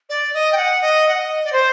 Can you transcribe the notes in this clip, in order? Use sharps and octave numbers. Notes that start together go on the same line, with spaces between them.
D5
D#5
G5
F#5
D#5
F#5
D#5
D5
C5